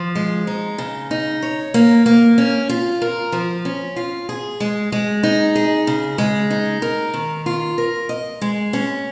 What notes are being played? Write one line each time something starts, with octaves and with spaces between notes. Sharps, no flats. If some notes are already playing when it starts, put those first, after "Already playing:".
Already playing: F3
G#3
D#4
C#3
D#4
C#5
A#3
A#3
C#4
F4
A#4
F3
C#4
F4
G#4
G#3
G#3
D#4
G#4
C#3
G#3
D#4
A#4
D#3
F4
A#4
D#5
G#3
C#4